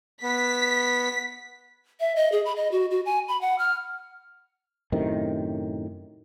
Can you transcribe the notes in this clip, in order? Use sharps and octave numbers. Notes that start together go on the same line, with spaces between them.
B3 B6
E5
D#5
G#4
B5
D#5
F#4
F#4
G#5
B5
F#5
F6
F#2 A2 C3 D#3